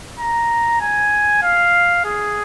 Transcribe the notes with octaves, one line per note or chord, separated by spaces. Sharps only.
A#5
G#5
F5
G#4